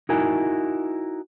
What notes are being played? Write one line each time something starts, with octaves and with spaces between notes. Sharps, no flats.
D#4 E4 F#4 A#4 G#5